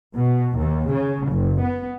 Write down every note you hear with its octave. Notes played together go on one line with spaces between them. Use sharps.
B2
D#2
C#3
F#1
B3